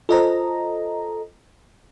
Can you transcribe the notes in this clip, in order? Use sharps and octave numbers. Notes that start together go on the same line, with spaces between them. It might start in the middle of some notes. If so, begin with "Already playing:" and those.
F4 A4 C5 D#5 A#5